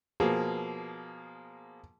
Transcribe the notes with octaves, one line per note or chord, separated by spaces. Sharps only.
B2 F3 A#3 G#4